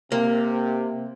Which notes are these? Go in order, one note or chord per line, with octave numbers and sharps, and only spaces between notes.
C3 A#3